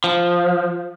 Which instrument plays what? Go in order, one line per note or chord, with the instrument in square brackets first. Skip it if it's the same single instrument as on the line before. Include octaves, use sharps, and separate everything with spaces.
[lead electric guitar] F3